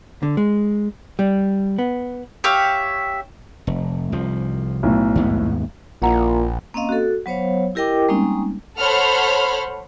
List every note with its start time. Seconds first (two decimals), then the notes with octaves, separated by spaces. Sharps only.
0.23 D3
0.37 G#3
1.19 G3
1.79 B3
2.44 G4 C#5 E5 F5
3.67 F1
4.12 C2 F3
4.83 B1 A2
5.16 D#2 G#2 B3
6.02 A#1 A#2 E4 F#5 A#5
6.74 A#3 C4 C#4 D#5 F5
6.89 F#4 A4
7.26 F#3 B3 C5 C#5 F5
7.75 E4 G4 A#4 D#5 G5 D6
8.09 G3 G#3 A#3 C4 C#4 D#4
8.79 A4 C5 C#5 F#5 B5 F6